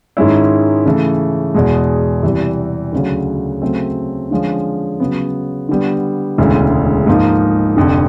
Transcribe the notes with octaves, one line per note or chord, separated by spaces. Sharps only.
G#2 D#3 G#3 C#4 E4
C#3 E3 A3
E2 B2 G#3
E2 C3 E3 G3
D2 C#3 F#3
C#3 F#3 A3 C4
D3 F3 G#3 C#4
C#3 F#3 B3
D3 G3 B3
E1 D2 C#3 E3 G#3
G#2 F3 A#3 D#4
F1 F2 D3